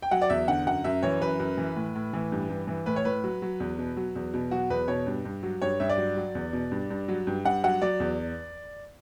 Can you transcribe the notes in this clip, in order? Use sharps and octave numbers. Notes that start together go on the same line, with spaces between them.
G5
F#3 F#5
D5
E2 E5
D3 F#5
F#2 F#5
F#2 E5
E3 C#5
F#2 B4
F#2
E3
A2
A2
E3
G2
G2
E3
A2 B4
C#5
A2 B4
F#3
F#3
E2
B2
F#3
E2
B2
F#3 F#4
E2 B4
B2 C#5
G2
G2
F#3
G2 C#5
G2 E5
D5
F#3
F#3
E2
B2
G2
G2
F#3
G2
G2 F#5
F#3 F#5
F#3 D5
E2